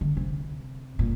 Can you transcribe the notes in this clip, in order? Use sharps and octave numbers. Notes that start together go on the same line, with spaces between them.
D3
C3
A#2